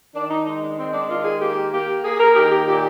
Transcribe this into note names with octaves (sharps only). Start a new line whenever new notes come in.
D#3 D4
D#4
G#3 D#4
D4
G#3 C4
D4
D#3 F4
G#4
A#3 G4
A#3 G4
A#3 G#4
A#4
G#4
D#3 G4
G4
A#2 G4